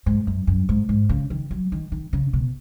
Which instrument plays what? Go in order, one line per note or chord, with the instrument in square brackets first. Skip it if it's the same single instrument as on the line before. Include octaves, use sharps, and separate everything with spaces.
[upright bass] G#2
F#2
F#2
G#2
G#2
C#3
D#3
F#3
D#3
D#3
C#3
B2